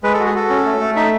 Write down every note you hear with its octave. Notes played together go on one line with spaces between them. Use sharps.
G#3 B4
A4
F#4
G#4
F#4 A4
C#4
A3
A3
D#4 E5